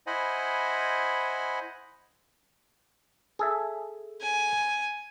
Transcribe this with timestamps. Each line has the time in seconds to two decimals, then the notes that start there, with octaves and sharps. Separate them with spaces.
0.07 E4 C5 D#5 F#5 G#5 B5
3.39 G#4 A4 E5
4.22 G#5